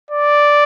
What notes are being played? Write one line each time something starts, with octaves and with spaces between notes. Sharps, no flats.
D5